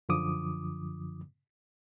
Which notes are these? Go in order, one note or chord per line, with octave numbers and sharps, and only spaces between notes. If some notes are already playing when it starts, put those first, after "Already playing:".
F#2 D3 F3 D6 D#6